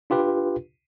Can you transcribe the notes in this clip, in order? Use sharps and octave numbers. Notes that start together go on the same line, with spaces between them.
D4 F4 G4 B4